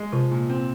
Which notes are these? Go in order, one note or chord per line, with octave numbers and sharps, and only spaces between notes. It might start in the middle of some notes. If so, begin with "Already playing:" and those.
Already playing: G#3
C3 F3
A#2
C4